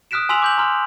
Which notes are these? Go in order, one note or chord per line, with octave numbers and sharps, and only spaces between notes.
D#6 F6 F#6 B6 D7 E7
G#5 C6 E6 B6 F7 F#7
D6 G6 F#7
A#5 C6 F6